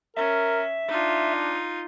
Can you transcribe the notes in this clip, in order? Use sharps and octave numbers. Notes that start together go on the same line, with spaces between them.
C#4 A#4 E5
D4 D#4 F4